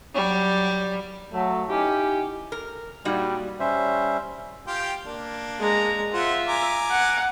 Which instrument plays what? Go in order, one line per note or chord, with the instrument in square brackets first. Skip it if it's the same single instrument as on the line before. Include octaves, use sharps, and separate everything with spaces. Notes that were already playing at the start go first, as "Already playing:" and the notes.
[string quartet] F#3 G3
[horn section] F#3 A3
C#4 D#4 E4 G4
[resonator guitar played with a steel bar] A#4
[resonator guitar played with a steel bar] A#2 D#4 F#4 [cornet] G3
[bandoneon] G3 C#4 C5 E5
[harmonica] F4 G4 G5
A#3 D4
[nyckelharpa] G#3 A#5
[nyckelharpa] F4 E5 [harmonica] C5 F#5
[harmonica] G#5 A#5 D6
[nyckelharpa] F#5